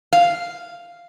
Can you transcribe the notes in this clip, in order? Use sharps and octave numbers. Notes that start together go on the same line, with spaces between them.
F5